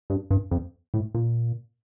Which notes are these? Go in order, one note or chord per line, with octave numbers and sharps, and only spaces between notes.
G2
G2
F2
A2
A#2